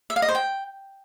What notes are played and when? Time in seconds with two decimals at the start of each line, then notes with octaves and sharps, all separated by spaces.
0.10 E5
0.16 F5
0.22 D#5
0.28 C5
0.35 G5